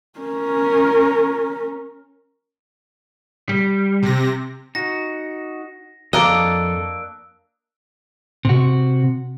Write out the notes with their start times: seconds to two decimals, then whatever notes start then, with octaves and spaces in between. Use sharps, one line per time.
0.19 C#4 A#4
3.49 G3
4.02 C3 A#6
4.75 D#4 F#4 A#6
6.13 F2 A#3 D4 A4 D#5 E6 F#6 D7
8.45 C3 F#4